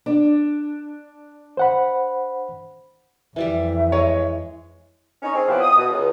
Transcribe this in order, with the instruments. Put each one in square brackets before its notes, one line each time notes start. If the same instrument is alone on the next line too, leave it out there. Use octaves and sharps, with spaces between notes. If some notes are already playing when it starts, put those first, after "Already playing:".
[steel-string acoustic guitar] D4
[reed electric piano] C5 F#5 B5
[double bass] F2 [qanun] E3 G3 G4 [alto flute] E5
[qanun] G#3 [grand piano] C#5
[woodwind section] C#4 D#4 C#5
C4 G#4
C3 F3 F#3 B3 E4 G4
D#6
B2
C#2